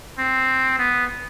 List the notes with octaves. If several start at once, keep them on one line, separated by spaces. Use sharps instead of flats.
C4
B3